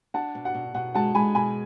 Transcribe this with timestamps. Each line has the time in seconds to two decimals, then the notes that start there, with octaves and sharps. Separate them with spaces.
0.14 D4 F#5 A5
0.35 B2
0.45 F#5
0.54 B2
0.74 B2 F#5
0.94 G#3 F#5 A5
1.15 G#3 G#5 B5
1.35 B2 G#5 B5